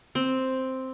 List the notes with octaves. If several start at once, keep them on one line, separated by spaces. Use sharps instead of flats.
C4